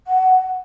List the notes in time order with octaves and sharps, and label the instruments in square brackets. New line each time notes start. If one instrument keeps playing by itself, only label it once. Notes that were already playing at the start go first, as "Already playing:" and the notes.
[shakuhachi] F#5